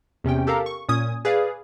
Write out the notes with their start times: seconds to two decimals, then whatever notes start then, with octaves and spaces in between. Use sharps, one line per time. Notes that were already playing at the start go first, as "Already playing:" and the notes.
0.24 E2 C3 C#4 G5
0.47 G4 A4 A#4 F5 A#5
0.66 C#6
0.89 A#2 C#4 D#6 G#6
1.25 G#4 B4 D5 F5